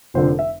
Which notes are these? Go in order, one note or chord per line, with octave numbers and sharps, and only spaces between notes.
F1 F2 D3 F3 C5
E5